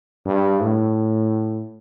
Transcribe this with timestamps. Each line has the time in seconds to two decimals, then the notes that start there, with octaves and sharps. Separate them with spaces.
0.26 G2
0.62 A2